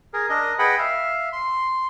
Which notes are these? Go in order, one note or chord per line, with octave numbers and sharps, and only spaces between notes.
G#4 A#4
D4 A#4 D#5
G#4 B4 D#5 F#5 G5 B5
E5 F5
C6